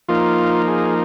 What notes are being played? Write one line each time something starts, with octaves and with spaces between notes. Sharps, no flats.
F3 A#3 D#4 F4
G#4